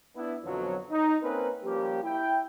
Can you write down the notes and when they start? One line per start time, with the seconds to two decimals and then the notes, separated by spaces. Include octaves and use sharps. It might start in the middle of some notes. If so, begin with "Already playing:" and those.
0.16 B3 D4 E4
0.44 F2 B2 D3 F3 F#3
0.91 D#4
1.23 A#3 C4 C#4 A#4 B4
1.64 F3 G3 A#3 C#4 G4
2.03 E4 G5